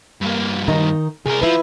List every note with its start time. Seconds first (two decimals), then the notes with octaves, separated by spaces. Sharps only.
0.21 G2 A#3
0.68 D#3 D#4 A#5
1.26 C2 G#4 A#4
1.42 F3 E4 B4